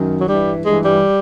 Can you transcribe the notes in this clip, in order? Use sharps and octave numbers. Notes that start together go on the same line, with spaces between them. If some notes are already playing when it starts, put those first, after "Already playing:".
Already playing: F#2 D#3
F#3
G2 E3 G3
G2 E3 G#3
G3